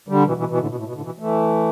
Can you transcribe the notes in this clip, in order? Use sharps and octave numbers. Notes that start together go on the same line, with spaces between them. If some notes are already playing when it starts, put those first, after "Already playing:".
D3 G3
B2 E3
B2 E3
B2 E3
A2 D3
B2
A2
B2
A2 D3
B2 E3
E3 A3